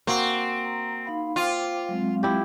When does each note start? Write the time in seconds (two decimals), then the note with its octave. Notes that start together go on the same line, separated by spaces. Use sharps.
0.07 A#3 C4 F#4
0.64 A#5
1.06 D#4 F5 B5
1.36 F4 C5 G5 D6
1.89 F#3 G#3 C4
2.23 E4 G4